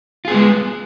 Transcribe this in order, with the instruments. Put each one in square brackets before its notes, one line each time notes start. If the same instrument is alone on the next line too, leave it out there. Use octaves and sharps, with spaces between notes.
[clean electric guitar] F4
G#4
B3
G#3